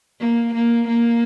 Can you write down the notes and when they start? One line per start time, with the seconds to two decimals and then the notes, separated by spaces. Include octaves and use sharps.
0.20 A#3
0.53 A#3
0.87 A#3